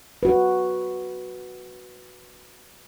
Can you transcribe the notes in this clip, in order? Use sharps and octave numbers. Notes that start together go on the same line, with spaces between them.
F#4 B4